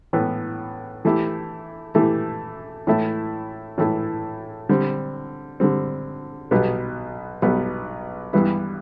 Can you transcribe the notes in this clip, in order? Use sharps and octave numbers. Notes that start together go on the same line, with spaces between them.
A2 E3 B3
E3 A3 E4 G4
E3 A3 E4 G4
A2 E3 A3 E4
A2 E3 A3 E4
D3 G3 C4
D3 G3 C4
B1 B2 G3 B3
B1 B2 G3 B3
G2 E3 G3 B3 E4